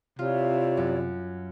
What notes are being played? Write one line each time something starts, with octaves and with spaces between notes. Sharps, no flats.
C3 E4 F4 C#5 D5
F#2